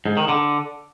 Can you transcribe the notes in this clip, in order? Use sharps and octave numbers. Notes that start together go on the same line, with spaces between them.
G#2
D#3
D3